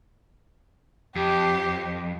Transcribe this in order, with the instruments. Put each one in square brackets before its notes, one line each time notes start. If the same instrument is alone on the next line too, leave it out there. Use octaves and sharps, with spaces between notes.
[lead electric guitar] F2 [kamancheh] G4